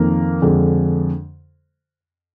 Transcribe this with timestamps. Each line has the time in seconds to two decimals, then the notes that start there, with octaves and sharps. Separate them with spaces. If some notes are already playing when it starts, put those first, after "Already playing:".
Already playing: F2 D#3 A#3
0.42 F2 D3 G#3